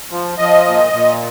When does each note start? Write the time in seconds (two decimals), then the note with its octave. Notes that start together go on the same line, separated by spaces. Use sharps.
0.11 F3
0.38 F3 D#5
0.66 A#2
0.93 A#2